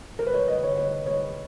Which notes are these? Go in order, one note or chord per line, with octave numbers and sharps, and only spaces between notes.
A#4
B4
C#5
D#5
C#5
C#5
C#5